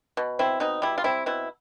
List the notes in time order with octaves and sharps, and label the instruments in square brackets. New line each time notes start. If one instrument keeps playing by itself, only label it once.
[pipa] B2
C4 E4
B2 D#4
G3 E4
F4
C4 E4
B2 E4